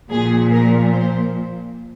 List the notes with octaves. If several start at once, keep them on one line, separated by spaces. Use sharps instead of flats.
A#2 F3 G#4
A#4
C5